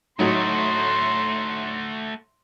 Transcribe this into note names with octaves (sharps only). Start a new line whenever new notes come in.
A2 F#3 A3 D#4 F#4 A#5 C6